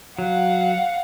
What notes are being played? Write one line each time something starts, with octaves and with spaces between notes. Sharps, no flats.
F#3 F5 F#5